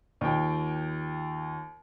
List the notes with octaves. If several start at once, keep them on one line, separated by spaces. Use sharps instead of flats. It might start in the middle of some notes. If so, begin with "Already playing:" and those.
D#2 F3 G5